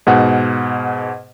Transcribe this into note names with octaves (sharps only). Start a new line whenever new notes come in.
G#2 B2 F#5